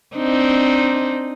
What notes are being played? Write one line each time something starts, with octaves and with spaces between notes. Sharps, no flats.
C4 D4 D#4